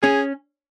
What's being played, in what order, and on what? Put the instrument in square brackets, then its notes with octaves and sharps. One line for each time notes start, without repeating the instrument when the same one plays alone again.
[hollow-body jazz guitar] C#4 [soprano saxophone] G#4